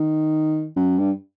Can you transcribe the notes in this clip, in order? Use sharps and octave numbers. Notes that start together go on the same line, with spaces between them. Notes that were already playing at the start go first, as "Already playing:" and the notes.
Already playing: D#3
F#2
G2